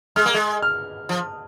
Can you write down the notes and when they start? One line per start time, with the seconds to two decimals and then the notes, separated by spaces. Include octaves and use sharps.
0.16 G#3 F6
0.26 A#3
0.34 G#3
0.62 F6
1.09 F3